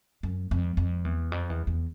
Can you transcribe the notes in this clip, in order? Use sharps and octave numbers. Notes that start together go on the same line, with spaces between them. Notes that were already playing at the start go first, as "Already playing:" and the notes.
F#2
F2
F2
E2
F2
E2
E2